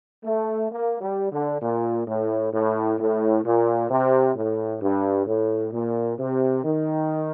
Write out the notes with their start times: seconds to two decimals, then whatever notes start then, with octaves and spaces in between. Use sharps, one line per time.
0.25 A3
0.71 A#3
1.01 G3
1.32 D3
1.62 A#2
2.08 A2
2.53 A2
2.99 A2
3.45 A#2
3.90 C3
4.36 A2
4.82 G2
5.27 A2
5.73 A#2
6.19 C3
6.65 D#3